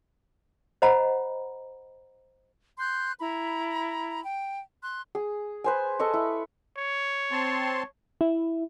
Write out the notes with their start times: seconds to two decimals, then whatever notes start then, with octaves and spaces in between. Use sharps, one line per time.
0.82 C5 D#5 F#5 A#5 B5
2.78 C6 F#6 G6
3.20 E4 A#5 B5
4.22 G5
4.82 C6 F#6
5.15 G#4
5.64 B4 C5 G#5
5.99 A4 D#5 C#6
6.14 E4
6.78 C#5
7.32 C4 A5 C6
8.21 E4